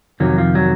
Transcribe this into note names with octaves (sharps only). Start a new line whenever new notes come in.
F2 C3 D#3 F#3
F3
F#3